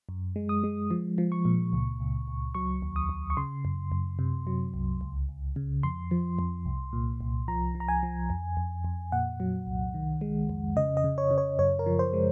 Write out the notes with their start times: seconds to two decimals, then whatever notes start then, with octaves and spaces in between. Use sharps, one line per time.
0.09 F#2
0.36 G#3
0.49 D#6
0.64 G#3
0.91 F3
1.18 F3
1.32 C#6
1.45 A#2
1.73 C#2
2.00 C#2
2.28 C#2
2.55 F#3 C#6
2.82 D#2
2.96 D#6
3.09 D#2
3.30 C#6
3.37 C#3 C6
3.65 F#2
3.92 F#2
4.19 C3
4.47 F#3
4.74 C2
5.01 C#2
5.29 C#2
5.56 C#3
5.83 F2 C6
6.11 F3
6.39 F2
6.66 C2
6.93 A#2
7.21 C2
7.48 F3 A#5
7.75 F3
7.80 A#5
7.88 G#5
8.03 F3
8.30 F2
8.57 F2
8.85 F2
9.12 A#2 F#5
9.40 F#3
9.67 C2
9.94 D#3
10.21 G#3
10.49 F2
10.76 C#3 D#5
10.97 D#5
11.04 C#3
11.18 C#5
11.31 C#3
11.38 C#5
11.59 F#2 C#5
11.79 A#4
11.86 F3
11.99 C5
12.13 G#3